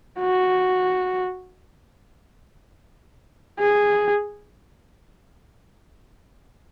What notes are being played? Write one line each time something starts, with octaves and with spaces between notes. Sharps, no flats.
F#4
G#4